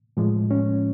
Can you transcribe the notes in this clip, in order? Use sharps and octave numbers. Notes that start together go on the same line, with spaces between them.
A2 F3 G#3
C#4